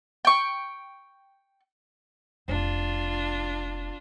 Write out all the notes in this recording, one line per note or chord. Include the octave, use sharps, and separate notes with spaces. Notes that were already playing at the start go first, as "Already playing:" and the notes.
G5 C#6
F1 C4 D4 F4